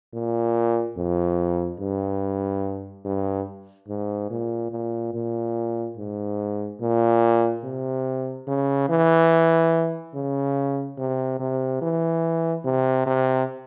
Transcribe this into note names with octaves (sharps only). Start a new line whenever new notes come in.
A#2
F2
G2
G2
G#2
A#2
A#2
A#2
G#2
A#2
C3
C#3
E3
C#3
C3
C3
E3
C3
C3